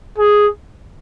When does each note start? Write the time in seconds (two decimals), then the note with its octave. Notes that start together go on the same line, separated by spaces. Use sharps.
0.18 G#4